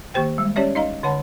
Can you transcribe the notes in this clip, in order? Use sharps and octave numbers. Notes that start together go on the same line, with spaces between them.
D#3 A#3 G4 C5 G5
G3 G#3
C#4 G4 C#5 D5 E5
D#4 D#5 F5 A#5
D3 C#5 F#5 A5 B5